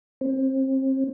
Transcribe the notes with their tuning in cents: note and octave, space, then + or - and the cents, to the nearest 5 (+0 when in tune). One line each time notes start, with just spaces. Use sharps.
C4 +30